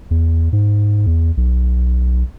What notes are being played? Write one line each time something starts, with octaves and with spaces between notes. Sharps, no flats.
E2
G#2
E2
B1